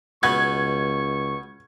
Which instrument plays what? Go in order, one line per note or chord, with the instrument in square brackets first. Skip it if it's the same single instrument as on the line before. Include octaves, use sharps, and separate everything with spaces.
[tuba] C#2 [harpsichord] B2 B3 [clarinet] C#6 [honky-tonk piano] G#6